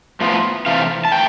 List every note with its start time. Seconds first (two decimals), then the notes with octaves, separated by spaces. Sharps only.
0.21 A2 F3 B3 F4
0.66 C3 E3 A3 F5
1.05 A5
1.12 A3 G5